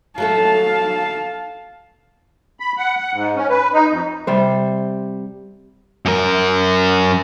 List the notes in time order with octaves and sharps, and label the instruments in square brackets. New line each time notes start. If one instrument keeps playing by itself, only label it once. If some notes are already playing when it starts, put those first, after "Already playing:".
[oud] F#3 A3 A4 [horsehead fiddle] F5 A5
[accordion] B5
F#5
F#5
G#2
C#4
B4
D#4
F2
[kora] C3 G3 C5
[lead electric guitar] F#2 A#4